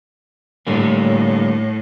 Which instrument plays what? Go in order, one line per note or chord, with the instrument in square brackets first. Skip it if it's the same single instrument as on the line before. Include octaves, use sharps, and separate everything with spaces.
[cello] A2 [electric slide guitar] D3 G3 A#3